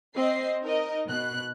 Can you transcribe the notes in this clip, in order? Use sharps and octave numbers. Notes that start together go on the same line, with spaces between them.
C4 D#5 C7
D#4 A#4 D#5
B2 F#6